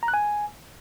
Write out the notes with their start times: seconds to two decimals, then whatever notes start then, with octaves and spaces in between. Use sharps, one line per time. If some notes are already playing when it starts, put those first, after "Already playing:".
0.03 A#5
0.08 F#6
0.14 G#5